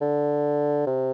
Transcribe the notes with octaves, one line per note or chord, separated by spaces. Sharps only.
D3
C3